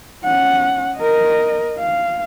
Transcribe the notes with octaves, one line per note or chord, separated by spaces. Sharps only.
C#4 F#5
A#4 D#5
F5